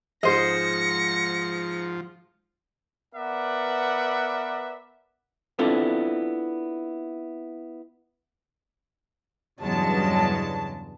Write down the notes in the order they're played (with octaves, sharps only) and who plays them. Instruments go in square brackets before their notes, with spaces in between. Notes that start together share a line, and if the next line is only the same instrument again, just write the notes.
[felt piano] G#2 G#3 [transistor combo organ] F3 [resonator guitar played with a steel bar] C5 D#5 [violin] A#6 C#7
[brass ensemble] B3 A#4 B4 D5 E5 F#5
[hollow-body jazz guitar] B3 C4 D4 E4 F4 A4
[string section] E2 G2 C#3 F#3 G#3 A5